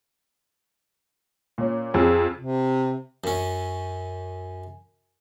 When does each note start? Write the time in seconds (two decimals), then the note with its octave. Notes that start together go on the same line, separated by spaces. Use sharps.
1.58 A#2 C#4
1.94 F2 G#4 E6
2.38 C3
3.24 F#2 C#4